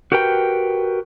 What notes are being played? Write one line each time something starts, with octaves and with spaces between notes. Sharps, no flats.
F#4 G4 A#4 B4 G5